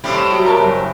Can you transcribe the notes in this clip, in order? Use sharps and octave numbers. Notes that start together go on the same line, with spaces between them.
A2 C3 G3
E7
F#3
A#4 A5
F#1